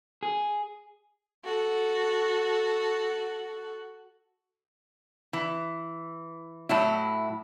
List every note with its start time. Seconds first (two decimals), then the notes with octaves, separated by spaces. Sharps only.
0.23 G#4
1.44 F#4 A4
5.33 E3
6.69 A2 F#3 E4